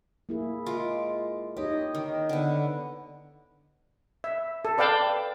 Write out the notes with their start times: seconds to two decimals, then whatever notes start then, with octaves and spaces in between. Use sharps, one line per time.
0.29 A#3 E4 G#4
0.66 G#3 F4 D6
1.57 D#4 G4 C#5 D#5
1.95 D#3
2.29 D3 B3
4.24 E5
4.65 A4
4.78 B4 D5 F5 G5 A5